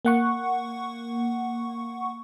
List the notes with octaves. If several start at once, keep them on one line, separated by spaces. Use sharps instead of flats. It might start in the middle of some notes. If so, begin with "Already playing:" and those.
A#3 F#5 C#6